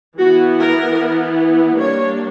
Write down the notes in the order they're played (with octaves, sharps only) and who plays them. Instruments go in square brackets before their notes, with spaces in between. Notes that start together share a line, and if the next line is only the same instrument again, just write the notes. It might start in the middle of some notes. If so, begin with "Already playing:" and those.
[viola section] E3 B3 E4 F#4
A#4
G3 A#3 D4 C#5